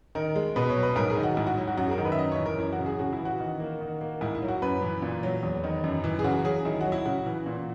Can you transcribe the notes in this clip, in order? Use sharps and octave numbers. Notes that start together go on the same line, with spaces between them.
D#3 A#4
G#3
B2 B4
C#5
F#3
B4
G#2 A#4
G#4
D#3
F#4
G#2 E4
F#4
F#3 E4
F#4
F#2 F#4
G#4
A#4
D#3
B4
E5
F#2 D#5
C#5
E3
A#4
F#2 E4
F#4
C#3
G#4
C#3 F#4
E4
E3
F#4
D#3
A#3
D#3
A#3
G#2 E4
E4
F#3
F#4
F#2 B4
E3
A#2
F#3
E2
D#3
F#2
E3
G#4
C#3 F#4
F#3 G#4
D#3 E4
F#3 F#4
E4
C#3 F#4
E3
A#2